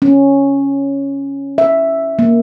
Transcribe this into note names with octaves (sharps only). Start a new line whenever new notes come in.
C#4
E5
A#3